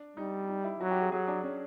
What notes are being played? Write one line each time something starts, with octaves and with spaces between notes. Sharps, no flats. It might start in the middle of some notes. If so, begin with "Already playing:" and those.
Already playing: D4
G3 D#4
D#4
E4
F#3 F#4
G4
G#4
F#3 G#4
D4
C#4